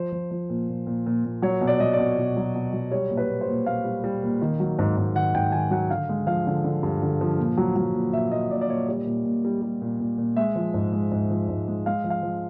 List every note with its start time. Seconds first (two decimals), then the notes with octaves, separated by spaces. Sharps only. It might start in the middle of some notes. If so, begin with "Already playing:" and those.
Already playing: F3 C5
0.12 F3
0.31 F3
0.50 A#2
0.69 A#2
0.87 A#2
1.06 A#2
1.25 A#2
1.42 F#3 C#5
1.61 B2
1.67 D5
1.80 F#3 D#5
1.93 D5
1.99 B2
2.18 B2
2.37 F#3
2.55 B2
2.73 F#3
2.91 G3 C#5
3.10 A#2
3.17 B4
3.29 A#2
3.41 C5
3.48 A#2
3.66 A#2 F5
3.85 G3
4.04 G3
4.23 A#2
4.42 D#3
4.60 F#3
4.79 G#2
4.97 G#2
5.15 D#3 F#5
5.34 G#2 G5
5.52 D#3 G#5
5.71 F#3 F#5
5.90 D3 F5
6.09 G#3
6.27 F3 F5
6.47 D3
6.64 D3
6.83 G2
7.02 D3
7.21 F3
7.39 A#2
7.57 F#3
7.76 F#3
7.95 A#2
8.13 A#2 E5
8.32 A#2 D#5
8.51 A#2 D5
8.61 D5
8.69 A#2 C#5
8.88 G3 D5
9.06 A#2
9.26 A#2
9.45 G3
9.62 G3
9.81 A#2
10.00 A#2
10.18 A#2
10.36 G#3 E5
10.56 F3
10.74 G#2
10.93 G#3
11.11 G#2
11.30 F3
11.49 G#2
11.68 G#3
11.86 G#3 F5
12.04 F3
12.10 F5
12.23 F3